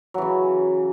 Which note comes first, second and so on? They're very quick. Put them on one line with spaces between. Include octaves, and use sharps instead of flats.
F#3 E3 C#3